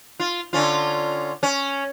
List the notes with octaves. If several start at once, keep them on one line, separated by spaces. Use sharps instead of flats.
F4
D3 C#4 F4
C#4